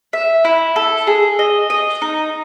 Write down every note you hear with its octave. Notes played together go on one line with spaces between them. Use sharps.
E5
E4
A4
G#4
D#5
D#5
D#4